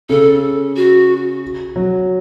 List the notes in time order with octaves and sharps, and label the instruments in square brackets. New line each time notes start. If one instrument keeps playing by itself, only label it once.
[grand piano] C#3 [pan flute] A4
[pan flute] F#4
[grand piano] F#3